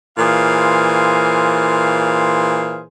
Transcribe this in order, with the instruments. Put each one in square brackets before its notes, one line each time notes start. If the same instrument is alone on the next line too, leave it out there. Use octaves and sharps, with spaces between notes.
[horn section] A#2 E3 G#4 C5 F5